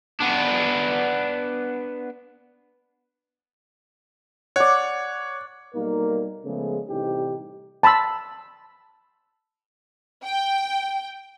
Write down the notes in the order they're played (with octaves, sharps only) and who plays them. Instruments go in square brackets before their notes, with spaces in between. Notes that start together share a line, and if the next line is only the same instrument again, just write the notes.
[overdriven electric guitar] B3 D4
[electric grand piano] C#5 [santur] D5 F#5
[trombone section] B1 G3 A#3 D#4 A#4
C#3 F3 G#3 A3 B3
A1 C3 G3 D#4 G4
[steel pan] A5 B5 C6 E6
[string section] G5